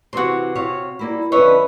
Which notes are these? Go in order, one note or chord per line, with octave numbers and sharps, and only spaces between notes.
C3 E3 F#4 C6
C3 C#5 F5
G3 A#3 E4
D3 F3 C#4 B4 C#5 D#5 E5